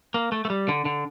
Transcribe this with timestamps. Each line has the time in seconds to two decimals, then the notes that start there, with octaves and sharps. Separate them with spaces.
0.14 A#3
0.32 A3
0.45 A3
0.50 G3
0.69 D3
0.85 D3